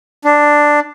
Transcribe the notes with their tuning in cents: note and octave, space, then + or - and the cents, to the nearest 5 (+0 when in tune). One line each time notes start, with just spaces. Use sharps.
D4 +5